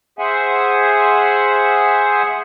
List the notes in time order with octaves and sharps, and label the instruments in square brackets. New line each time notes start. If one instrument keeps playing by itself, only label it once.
[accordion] G#4 C5 E5 F#5 G#5